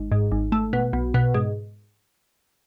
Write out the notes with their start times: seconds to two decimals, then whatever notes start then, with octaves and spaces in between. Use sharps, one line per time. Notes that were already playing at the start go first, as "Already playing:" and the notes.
Already playing: G#1
0.12 G#2
0.32 G#1
0.52 A3
0.73 B2
0.93 B1
1.14 B2
1.34 G#2